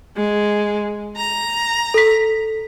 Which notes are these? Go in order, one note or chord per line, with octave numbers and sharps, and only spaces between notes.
G#3
A#5
A4 B6